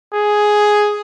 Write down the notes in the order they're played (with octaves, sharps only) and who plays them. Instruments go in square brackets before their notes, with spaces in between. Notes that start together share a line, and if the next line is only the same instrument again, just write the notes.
[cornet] G#4